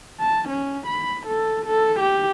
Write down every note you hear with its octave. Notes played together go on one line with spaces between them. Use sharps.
A5
C#4
B5
A4
A4
G4